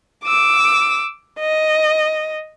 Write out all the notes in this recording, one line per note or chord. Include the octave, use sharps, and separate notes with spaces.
D6 E6
D#5